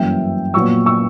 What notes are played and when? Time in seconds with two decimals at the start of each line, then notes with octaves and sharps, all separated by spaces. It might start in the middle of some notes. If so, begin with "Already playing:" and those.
Already playing: G1 F#2 E3 A#3 E5 G5
0.54 A#1 A#2 F#3 B3 C#6 E6
0.86 C#6 E6